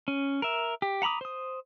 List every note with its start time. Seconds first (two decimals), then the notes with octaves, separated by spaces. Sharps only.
0.08 C#4
0.42 A#4 E5
0.82 G4
1.02 F#5 A#5 B5 D6 D#6
1.21 C5 D#6